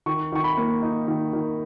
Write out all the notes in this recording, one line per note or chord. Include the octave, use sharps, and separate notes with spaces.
D#3 C#6
D#3 C#6
B5
A#3
D#4
D#3
D#3